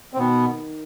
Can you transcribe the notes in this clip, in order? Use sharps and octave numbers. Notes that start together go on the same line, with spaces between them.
C4
B2 D#3 B3